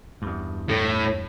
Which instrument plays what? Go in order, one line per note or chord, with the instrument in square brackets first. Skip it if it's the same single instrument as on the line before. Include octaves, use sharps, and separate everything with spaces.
[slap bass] E2 G2
[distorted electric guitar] A2